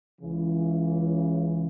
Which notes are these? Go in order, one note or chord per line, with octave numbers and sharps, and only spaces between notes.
C#2 C#3 E3